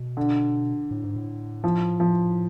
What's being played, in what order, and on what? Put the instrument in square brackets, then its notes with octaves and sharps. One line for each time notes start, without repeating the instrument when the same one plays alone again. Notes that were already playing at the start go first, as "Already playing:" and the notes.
Already playing: [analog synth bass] B2
[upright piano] D3
[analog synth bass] A2
G#2
A2
[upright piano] F3
F3